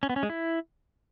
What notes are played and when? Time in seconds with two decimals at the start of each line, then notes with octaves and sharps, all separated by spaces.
0.03 C#4
0.10 B3
0.16 C#4
0.23 G#3
0.30 E4